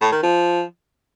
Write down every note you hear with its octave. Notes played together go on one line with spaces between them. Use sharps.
A2
D#3
F3